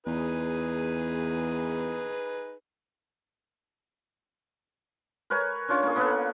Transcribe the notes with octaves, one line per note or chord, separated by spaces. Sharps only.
E2 D#4 G#4 B4
A#4 B4 C#5 G#5
C#4 D4 F4 C#5
A#3 G#4
A#3 B3 A4 B4